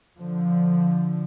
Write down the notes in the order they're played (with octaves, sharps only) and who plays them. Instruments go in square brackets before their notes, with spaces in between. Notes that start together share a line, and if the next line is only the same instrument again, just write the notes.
[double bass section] D3 F3